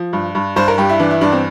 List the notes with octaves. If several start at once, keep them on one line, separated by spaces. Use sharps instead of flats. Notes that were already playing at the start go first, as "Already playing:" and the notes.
Already playing: F3
G2
G2
G2 C5
A#4
G2 G4
E4
E3 D4
E4
G2 D4
C4